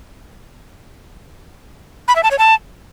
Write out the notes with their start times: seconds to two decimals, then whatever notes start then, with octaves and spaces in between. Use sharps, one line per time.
2.08 B5
2.16 E5
2.23 A5
2.31 C#5
2.39 A5